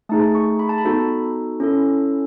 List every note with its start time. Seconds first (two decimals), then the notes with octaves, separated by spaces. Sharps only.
0.09 A3 D#4 G#4 A5
0.35 C#6
0.59 B5
0.69 A5
0.78 B5
0.85 B3 D#4 F#4 A4
1.60 C#4 E4 A4